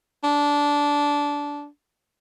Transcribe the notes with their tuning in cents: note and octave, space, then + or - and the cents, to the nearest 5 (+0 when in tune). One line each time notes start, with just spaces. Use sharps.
D4 -15